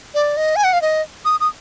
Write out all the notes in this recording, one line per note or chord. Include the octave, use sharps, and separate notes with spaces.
D5
D#5
G#5
F#5
F5
D#5
D#6
D#6